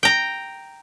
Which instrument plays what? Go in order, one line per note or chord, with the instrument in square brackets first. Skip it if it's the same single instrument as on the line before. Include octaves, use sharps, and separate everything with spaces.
[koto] G5 A#5